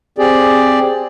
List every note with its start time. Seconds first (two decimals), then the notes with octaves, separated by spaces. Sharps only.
0.18 C4 G4 G#4 D5